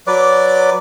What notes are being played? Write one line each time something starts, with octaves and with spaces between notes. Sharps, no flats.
F#3 B4 D5 D6